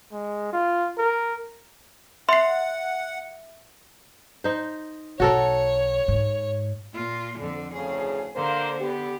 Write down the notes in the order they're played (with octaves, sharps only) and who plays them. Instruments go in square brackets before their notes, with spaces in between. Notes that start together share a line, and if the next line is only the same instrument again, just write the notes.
[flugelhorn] G#3
F4
A#4
[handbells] E5 [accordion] F#5 [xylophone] C6 C7
[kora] D#4 C5
[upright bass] B1 [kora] F#4 A4 A#4 [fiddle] C#5
[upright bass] G#2
[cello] A#2 F4
F2 D3
[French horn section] D2 A2 C#3 [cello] G#4
[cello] D3 [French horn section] A#3 C5
[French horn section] B3 G4